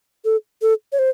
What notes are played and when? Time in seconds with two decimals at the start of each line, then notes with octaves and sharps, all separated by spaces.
0.25 A4
0.62 A4
0.92 C#5
0.99 C5